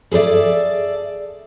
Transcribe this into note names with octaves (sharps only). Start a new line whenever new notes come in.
G#4 A4 B4 D5 E5